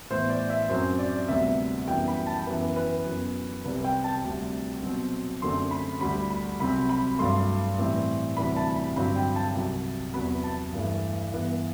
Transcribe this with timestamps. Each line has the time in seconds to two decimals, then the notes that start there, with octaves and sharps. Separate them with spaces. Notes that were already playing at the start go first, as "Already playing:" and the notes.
0.10 A2 E3 B3 C5
0.30 D5
0.50 E5
0.69 F#2 F#3 C4 C5
0.99 D5
1.28 D2 C3 G3 B3 E5
1.88 F#2 E3 G3 B3 G5
2.08 B5
2.27 A5
2.47 F#2 E3 B3 B4
2.76 B4
3.06 F#2 F#3 B3
3.65 C2 C3 G3 C4 B4
3.84 G5
4.04 A5
4.24 D2 C3 G3
4.83 B2 F#3 C4
5.42 F#2 D3 A3 C4 C6
5.71 B5
6.01 D2 D3 G3 B5
6.30 B5
6.60 C2 C3 F#3 C4 B5
6.89 B5
7.19 G2 F#3 A3 C6
7.78 A2 E3 G3 C4
8.37 D2 C3 E3 G3 B5
8.57 A5
8.76 B5
8.96 G2 D3 F#3 C4 B5
9.16 G5
9.36 A5
9.55 C2 C3 F#3
10.14 E2 C3 F#3 B3 B5
10.44 A5
10.73 G2 E3 A3
11.32 G2 E3 B3